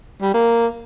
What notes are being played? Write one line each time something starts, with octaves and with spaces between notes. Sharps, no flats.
G3
A#3